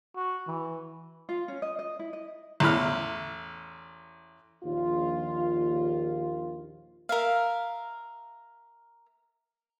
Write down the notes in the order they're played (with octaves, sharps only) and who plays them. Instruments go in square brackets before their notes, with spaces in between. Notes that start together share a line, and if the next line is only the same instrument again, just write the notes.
[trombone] F#4
E3
[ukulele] F4
C#4
D#5
D#5
E4
D#5
[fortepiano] A1 E2 E4 B5 F6
[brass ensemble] A#1 D#2 F4
[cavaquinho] A#4 E5 F5